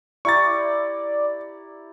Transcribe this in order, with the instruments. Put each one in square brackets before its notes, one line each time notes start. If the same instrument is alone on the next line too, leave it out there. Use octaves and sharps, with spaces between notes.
[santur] E4 G4 A#5 [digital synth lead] D5 [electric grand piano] C#6 A6